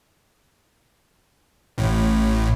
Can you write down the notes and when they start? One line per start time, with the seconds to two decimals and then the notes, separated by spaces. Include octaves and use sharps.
1.78 A1 A2